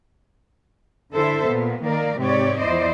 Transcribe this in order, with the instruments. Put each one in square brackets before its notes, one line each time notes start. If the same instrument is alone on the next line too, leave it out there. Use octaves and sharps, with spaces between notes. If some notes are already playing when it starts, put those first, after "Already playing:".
[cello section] D3 E4 A4 C5 E5
A#2 B3
D#3 A#3 A#4 D5
G#2 C3 C4 G4 C#5 D5
E2 F3 E4 C5 D5 D#5